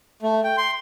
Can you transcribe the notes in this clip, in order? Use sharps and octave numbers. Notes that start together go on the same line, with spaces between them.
A3
G5
C6